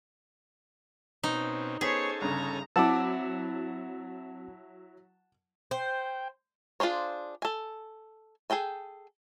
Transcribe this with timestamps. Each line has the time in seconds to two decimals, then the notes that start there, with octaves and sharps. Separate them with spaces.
1.24 B2 C4 C#4 D#4
1.81 B3 C#4 G#4 A4 C5 C#5 G#5 B6
2.22 G1 C#3 A#5
2.76 F#3 C4 E4 F#5 A5 D6 E6
5.71 C5 G5
6.80 D4 F4 G#4 C5 C#5
7.42 A4 G#5
8.50 G#4 A4 G5 G#5